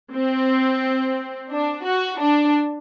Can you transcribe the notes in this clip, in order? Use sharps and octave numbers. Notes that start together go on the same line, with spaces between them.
C4
D4
F#4
D4